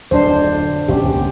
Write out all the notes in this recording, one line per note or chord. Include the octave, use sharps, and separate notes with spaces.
D1 F2 B2 D4 C5
G1 B2 F3 C#4 G4
D#1 C#2 B3